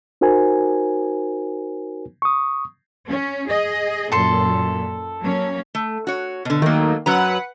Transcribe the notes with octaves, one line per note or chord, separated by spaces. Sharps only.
D#4 F#4 A#4 C5 G#5
C#6 D#6
C#4
G#4 D#5
F#2 A#2 A4 C6
F#3 A#3 C#4
A3
F#4 C#5
B2 D3
D#3 F#3 A3 A#3
F#2 F#3 B4 F#5 A#5